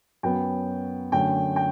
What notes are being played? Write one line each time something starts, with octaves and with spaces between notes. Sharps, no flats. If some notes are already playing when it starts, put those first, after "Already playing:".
F#2 F#3 B3 G5
F#2 D3 A3 G5
G5